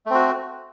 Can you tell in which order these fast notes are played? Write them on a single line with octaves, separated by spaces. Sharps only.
A3 C4 F#4